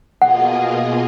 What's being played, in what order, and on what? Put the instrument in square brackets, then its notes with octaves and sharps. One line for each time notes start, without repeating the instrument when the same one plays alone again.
[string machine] B2 A#3 F4 G#4 D#5 [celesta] F#5